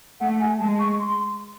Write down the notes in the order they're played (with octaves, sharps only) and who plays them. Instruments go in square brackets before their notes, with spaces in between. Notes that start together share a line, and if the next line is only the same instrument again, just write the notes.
[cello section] A3 [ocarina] F#5
[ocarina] G#5
[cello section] G#3 [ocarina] A5
[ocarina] C#6
C6